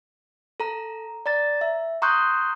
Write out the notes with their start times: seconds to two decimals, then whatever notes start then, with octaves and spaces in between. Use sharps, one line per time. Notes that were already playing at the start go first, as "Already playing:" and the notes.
0.60 A4 A#5
1.26 D5 A#5 A6
1.61 E5
2.02 A#5 C6 C#6 D#6 F#6 G6